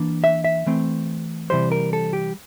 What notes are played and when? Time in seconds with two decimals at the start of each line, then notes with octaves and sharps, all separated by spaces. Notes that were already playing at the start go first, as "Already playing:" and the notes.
Already playing: E3 A#3 D4
0.24 E5
0.44 E5
0.66 E3 A3 C4
1.50 C3 E3 G3 C5
1.72 A#4
1.93 A4
2.13 G4